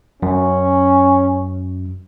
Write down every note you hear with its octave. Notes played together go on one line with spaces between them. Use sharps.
F#2 C#4